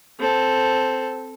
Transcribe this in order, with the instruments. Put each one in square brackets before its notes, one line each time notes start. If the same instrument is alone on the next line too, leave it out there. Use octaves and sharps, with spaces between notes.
[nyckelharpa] C4 A4